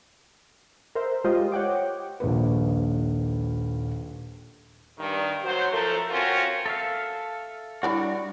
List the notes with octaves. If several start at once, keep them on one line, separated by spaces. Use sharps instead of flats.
A#4 C5 E5
G#3 F4 G4 C5 D#5
C#5 F#5 G5 D6
D#1 A#1 A#3 B4
G2 D#3
F#3 F#4 C5
F#2 F3 A3 A4 A#4
C4 C#4 F4 F#4 A#4 C5
A4 E5 F5
G3 D4 E4 F#4 D5 F#5